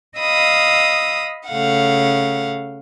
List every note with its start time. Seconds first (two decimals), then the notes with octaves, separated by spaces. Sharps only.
0.18 D#5 F5 B5 D#6 E6
1.49 C#3 A3 F5 F#5